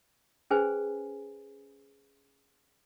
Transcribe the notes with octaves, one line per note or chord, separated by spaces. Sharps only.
C#4 G#4 B4 C5 G#5